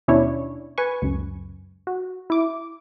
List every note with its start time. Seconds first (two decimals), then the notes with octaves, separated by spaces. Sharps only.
0.08 D#2 B2 C#4 D4 E4 C#5
0.78 B4 G#5 C#6
1.02 C#2 F#2
1.87 F#4
2.30 E4 D6